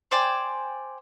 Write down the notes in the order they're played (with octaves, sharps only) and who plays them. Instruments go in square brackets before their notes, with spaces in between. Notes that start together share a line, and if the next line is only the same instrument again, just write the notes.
[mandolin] C5 D5 G5 G#5